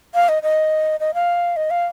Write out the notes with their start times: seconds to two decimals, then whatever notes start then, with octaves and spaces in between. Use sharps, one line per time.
0.14 F5
0.29 D#5
0.43 D#5
1.00 D#5
1.14 F5
1.56 D#5
1.70 F5